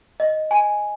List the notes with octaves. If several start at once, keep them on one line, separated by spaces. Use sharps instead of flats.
D#5
G#5